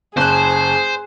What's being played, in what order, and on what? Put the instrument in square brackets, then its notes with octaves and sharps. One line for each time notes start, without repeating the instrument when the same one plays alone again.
[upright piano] F#1 F#6 [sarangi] G#4 [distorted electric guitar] C5 [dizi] A5